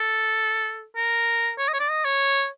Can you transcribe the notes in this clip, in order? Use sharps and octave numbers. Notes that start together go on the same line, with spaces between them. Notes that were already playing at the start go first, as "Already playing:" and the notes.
Already playing: A4
A#4
C#5
D#5
C#5
D5
D#5
C#5